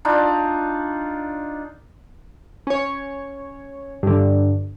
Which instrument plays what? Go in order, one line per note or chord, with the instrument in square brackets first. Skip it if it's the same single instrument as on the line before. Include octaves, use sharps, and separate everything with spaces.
[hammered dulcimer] D4 D#4 F4
[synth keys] C#4 C#5
G2 D3